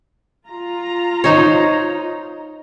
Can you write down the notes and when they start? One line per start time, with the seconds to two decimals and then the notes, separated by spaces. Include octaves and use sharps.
0.47 F4 A#5
1.24 D#4 C5 C#5